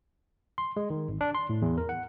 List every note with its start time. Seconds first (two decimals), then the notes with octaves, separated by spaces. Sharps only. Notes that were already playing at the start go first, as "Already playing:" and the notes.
0.58 C6
0.77 G#3
0.90 D#3
1.08 G#1
1.21 D4
1.35 C6
1.49 A2
1.62 E2
1.78 A#4
1.89 F#5